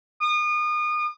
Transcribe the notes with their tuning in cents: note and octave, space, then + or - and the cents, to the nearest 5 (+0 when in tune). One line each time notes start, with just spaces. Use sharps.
D#6 -35